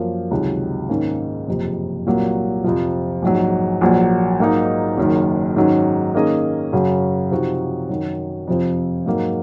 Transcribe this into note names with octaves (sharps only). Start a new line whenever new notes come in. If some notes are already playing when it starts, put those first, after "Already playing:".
Already playing: F#2 F3 A#3
C#2 C3 D#3 F#3
G#2 D#3 A#3 C#4
F#1 F2 C3
C2 A#2 F#3 A#3
F2 C3 F3
A#1 G#2 F#3
A#1 A#2 F#3
G#2 F#3 A#3 D#4
F#1 F#2 D#3
G#2 D#3 F#3 C#4
D#3 A#3 C#4 G#4 D#5
F#2 C#3 F#3
C3 F3 C4 D#4 F#4
F#2 D#3 F#3
F2 C3 F3 C4
G#2 F#3 A#3